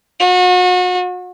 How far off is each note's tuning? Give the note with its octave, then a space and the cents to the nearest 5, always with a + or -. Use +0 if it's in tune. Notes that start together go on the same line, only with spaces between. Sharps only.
F#4 -35